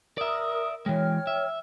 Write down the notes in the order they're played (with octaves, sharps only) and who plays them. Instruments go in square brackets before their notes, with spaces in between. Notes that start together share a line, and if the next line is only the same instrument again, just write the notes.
[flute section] A#4 D#6 [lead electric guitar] D5 E5
[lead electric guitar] E3 G#3 [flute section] C#5 G5 F6
[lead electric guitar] E5